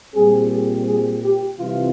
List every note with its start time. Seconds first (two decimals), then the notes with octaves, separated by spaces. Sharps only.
0.15 A#2 G3 C4 G#4
0.51 G#4
0.87 G#4
1.23 G4
1.59 C3 E3 G3 C4 F4